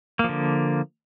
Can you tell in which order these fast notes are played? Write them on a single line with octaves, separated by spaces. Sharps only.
A#3 F3 D3